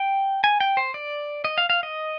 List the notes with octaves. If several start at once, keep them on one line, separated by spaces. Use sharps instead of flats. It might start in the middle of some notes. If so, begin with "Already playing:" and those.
Already playing: G5
G#5
G5
C5
D5
D#5
F5
F5
D#5